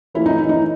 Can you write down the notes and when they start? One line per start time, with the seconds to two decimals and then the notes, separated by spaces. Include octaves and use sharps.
0.14 E3 A3 C#4 E4 F4 A#4
0.26 D#4
0.38 E4
0.49 D#4